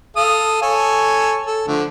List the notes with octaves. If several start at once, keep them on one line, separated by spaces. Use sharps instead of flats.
A4 F5 D#6
A4 C#5 G#5
A4
D3 F3 A3